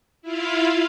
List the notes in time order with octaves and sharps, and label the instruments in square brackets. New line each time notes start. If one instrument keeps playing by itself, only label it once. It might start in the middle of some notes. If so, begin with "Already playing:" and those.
[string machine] E4 F4 F5